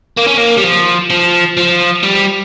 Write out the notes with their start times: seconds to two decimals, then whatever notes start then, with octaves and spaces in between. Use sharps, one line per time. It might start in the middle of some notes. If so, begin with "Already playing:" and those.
0.18 A#3
0.27 C#4
0.38 A#3
0.57 G3
0.64 F3
1.10 F3
1.57 F3
2.04 G3